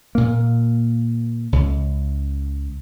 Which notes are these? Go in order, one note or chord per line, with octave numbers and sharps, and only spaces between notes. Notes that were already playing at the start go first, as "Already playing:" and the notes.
A#2 A#3
C#2